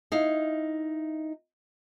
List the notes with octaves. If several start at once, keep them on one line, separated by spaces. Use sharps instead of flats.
D#4 E4 F5